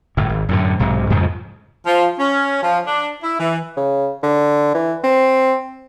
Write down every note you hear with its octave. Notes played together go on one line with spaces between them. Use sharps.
G1 A2
G#1
F#2 A2 D3
B1 G#2 C3
F2 G#2 C#3 F3
F3
C#4
F3
D4
E4
E3
C#3
D3
E3
C4